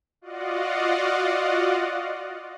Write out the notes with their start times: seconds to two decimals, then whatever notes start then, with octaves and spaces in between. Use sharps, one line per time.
0.21 F4 F#4 D5 D#5 F5 F#5